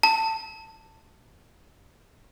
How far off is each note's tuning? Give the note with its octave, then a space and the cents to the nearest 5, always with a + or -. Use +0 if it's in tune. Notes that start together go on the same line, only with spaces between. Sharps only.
A5 +20